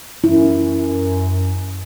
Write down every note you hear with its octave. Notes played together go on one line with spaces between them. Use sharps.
F#2 E4